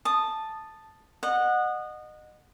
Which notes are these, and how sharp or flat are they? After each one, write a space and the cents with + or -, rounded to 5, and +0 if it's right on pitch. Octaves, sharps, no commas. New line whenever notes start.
A5 +0 D#6 -15
D#5 -25 F#5 -15